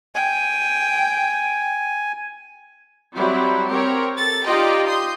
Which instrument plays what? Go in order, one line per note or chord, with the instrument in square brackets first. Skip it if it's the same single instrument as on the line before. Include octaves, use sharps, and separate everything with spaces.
[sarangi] G5 [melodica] G#5
[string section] F#3 G3 C4 E4
C4 G4 A#4 C#5
A4 A6
D#4 F4 G4 D5 D#5 G5
C6 D#6 G6